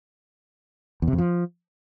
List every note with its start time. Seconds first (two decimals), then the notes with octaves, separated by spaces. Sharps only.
1.02 E2
1.08 C3
1.13 F2
1.18 F3